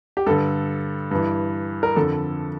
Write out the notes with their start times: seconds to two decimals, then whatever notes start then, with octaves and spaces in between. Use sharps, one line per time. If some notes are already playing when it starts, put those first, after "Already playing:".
0.17 G4
0.26 G2 D3 A4
1.11 G2 E3
1.83 A#4
1.96 F2 D3 A4